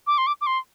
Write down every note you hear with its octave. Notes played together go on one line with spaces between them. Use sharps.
D6
C6
D6
D6
C6